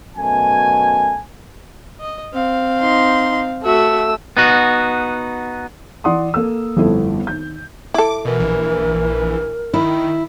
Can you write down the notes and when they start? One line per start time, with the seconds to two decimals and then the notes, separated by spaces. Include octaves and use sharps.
0.16 F#2 B2 A3 G#5
2.00 D#5
2.33 C4 F5
2.81 D#4 C6
3.64 A3 F#4 E5 E6
4.37 B3 D#4 F#4
6.04 E3 D5 F#5 C6 D#6
6.34 A#3 A4 E6
6.77 G1 F2 A3 B3 E4 A4
7.27 D#3 G6
7.94 E4 A4 D6
8.25 B2 E3 A#4
8.40 A#1 E3
9.74 D#3 E4